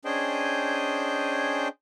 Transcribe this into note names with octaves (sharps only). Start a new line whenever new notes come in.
C#4 D4 G#4 C5 D#5 G5